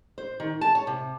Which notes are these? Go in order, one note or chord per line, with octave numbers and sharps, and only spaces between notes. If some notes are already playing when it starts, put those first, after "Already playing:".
C5
D#3
A5
C#5
C3